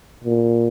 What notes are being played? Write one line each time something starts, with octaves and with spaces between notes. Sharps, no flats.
A#2